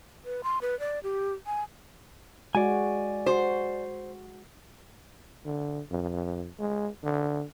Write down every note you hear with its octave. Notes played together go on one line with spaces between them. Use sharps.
B4
C6
B4
D5
G4
G#5
G#3 F#4 D5 G#5
F#4 C5
D3
F2
G#3
D3